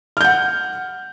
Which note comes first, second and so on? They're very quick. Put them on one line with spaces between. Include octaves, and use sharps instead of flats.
F6 G6 F#5